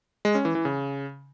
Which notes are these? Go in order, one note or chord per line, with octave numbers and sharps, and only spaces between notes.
G#3
C#4
E3
E3
C#3